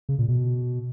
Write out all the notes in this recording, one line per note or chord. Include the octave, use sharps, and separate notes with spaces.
C#3
A#2
B2